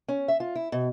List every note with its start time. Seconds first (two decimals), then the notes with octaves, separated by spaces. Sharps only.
0.08 C#4
0.28 E5
0.40 F4
0.55 E4
0.72 B2